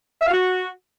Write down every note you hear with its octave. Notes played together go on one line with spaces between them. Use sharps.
E5
F5
F#4